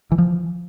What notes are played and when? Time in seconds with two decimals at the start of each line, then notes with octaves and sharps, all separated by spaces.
0.12 E3
0.18 F3